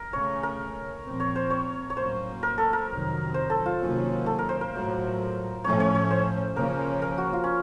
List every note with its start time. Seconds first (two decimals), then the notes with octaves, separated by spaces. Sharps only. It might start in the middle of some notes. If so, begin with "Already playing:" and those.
Already playing: A#4
0.13 C#3 A3 C#4 C#5
0.43 A#4
1.05 A#2 F3 C4
1.20 C#5
1.36 C5
1.50 C#5
1.90 C#5
1.97 A2 F#3 A#3 C#4 C5
2.43 A#4
2.58 A4
2.73 A#4
2.89 F2 C3 D#3 F#3
3.34 C5
3.50 A4
3.66 F4
3.80 C3 D#3 F#3 A#3 C#4
4.26 A4
4.39 A#4
4.49 C5
4.61 A#4
4.73 A2 F#3 A3
5.64 A2 F3 A3 C#4 C#5
5.80 C#5
5.95 C#5
6.11 C5
6.56 C#3 F3 A#3 C#4 A#4
7.02 A#4
7.18 F#4
7.33 F4
7.44 C#4